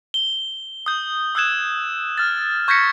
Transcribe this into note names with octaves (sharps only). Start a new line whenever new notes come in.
G7
D#6 G6
D#6 E6 F#6 G#6 E7
F6 A6
C#6 G6 G#6 A#6 B6 C#7